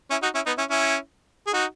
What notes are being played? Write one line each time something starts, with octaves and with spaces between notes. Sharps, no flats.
C#4 E4
D#4 F#4
C#4 E4
B3 D#4
C#4 E4
C#4 E4
G#4
D#4 F#4